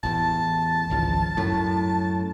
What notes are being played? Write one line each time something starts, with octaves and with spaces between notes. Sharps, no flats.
A1 E2 A5
G#1 C#2 F3
F#2 A2